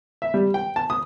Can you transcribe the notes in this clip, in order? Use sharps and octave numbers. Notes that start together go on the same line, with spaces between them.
E5
G3
G5
A5
D#6